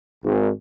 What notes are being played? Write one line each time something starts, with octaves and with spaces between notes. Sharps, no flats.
G#1